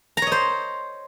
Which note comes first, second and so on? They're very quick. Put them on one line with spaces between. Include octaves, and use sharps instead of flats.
A#5 C#5 D#5 C5